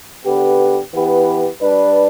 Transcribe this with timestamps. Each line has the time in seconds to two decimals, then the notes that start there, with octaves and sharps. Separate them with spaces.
0.25 D3 B3 G4 B4
0.93 E3 B3 G4 B4
1.61 G3 D4 B4